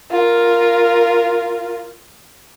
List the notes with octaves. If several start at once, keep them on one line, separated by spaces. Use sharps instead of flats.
F4 A#4